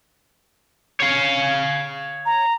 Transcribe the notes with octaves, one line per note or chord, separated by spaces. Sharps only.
C#5 F5
A#5